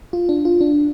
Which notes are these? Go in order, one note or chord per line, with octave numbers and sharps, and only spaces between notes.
F4
D4
F4
D4